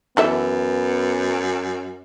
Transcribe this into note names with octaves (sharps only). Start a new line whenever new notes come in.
F#2 E3 B3 A4 E5